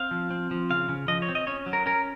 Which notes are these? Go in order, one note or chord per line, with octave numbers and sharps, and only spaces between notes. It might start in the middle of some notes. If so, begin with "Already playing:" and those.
Already playing: C4 F5
F3
C4
F3
C#3 F5
C#3
F3 D#5
C#5
C4
D#5
C#4 C#5
F#3
A#4
C#4 A#4